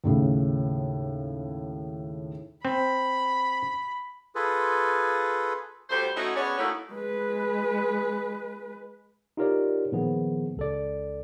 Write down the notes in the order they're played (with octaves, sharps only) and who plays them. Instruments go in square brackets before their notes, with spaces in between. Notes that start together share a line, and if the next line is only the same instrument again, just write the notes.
[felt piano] D#2 A2 C#3
[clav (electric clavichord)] C4 [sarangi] B5
[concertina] F4 G#4 A4 B4
[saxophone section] D2 G3 A3 C5
A3 C#4 D#4 E4 F#4
B3 C#4 D4 G#4 C#5
A3 A#3 C#4 D#4 E4 F#4
[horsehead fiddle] G#3 B4
[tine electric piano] D#4 F4 G4 A#4 C#5 D5
A#2 D#3 F3 B3 G#4
C#2 A4 D5